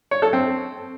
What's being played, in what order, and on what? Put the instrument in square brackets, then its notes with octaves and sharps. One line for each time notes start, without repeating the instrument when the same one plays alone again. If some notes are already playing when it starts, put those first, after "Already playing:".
[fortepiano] C#5
A4
C4